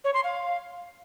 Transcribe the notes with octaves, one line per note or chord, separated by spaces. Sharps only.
C#5
C6
F5